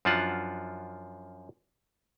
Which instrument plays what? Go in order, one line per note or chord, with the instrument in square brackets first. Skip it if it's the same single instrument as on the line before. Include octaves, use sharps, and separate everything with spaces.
[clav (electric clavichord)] F#2 F3 D4 F4 F#4 F#5